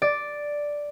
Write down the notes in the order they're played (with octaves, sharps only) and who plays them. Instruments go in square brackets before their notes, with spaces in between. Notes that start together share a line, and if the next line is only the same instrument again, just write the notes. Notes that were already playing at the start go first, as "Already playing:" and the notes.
[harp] D5